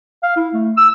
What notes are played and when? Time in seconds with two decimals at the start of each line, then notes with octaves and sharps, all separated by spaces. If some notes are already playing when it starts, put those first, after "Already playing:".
0.23 F5
0.37 E4
0.54 A3
0.77 E6